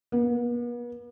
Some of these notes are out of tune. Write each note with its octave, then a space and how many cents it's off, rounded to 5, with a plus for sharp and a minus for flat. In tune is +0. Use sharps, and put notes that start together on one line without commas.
B3 -45